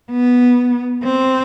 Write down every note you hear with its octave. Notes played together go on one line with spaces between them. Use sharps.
B3
C4